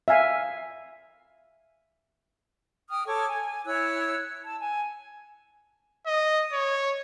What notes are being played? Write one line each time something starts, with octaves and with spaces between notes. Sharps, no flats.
E5 F5 G#5
G5 D#6 F6
A4 C#5 C#6 D6
G#5
E4 C#5 E6 F#6
A5
G#5
D#5
C#5